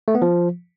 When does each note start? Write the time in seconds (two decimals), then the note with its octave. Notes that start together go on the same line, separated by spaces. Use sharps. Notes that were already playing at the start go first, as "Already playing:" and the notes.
0.08 A3
0.15 B3
0.22 F3